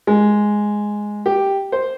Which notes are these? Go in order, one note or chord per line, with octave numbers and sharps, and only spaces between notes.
G#3
G4
C5